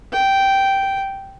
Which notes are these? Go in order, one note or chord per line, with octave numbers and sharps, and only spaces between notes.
G5